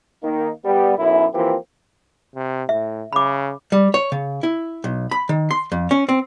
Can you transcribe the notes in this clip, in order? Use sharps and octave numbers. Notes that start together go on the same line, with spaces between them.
D#3 A#3 D#4
G3 B3
B1 F#2 E4
E3 F3 A#3 C4 F4 G4
C3
A2 E5
C#3 B5 D6
G3
C#5
C#3
E4
B1
B5
D#3
C6
F2
C#4
C4